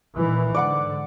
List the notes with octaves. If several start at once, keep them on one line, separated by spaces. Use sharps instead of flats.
A#2 D#3 E3
G#2 D3 D5 F#5 D6